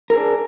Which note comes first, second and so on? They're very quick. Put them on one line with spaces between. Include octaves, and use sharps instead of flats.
A#4 G#4 D4